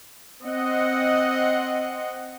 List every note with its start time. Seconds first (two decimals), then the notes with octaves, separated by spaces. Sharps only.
0.42 C4 D#5 F#5